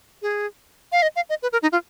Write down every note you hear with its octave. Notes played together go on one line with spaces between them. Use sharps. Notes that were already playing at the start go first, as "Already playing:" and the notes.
G#4
F5
D#5
F5
D#5
B4
A#4
D#4
F4